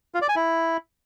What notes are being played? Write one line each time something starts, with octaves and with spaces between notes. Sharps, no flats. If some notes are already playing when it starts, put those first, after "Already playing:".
F4
D5
G#5
E4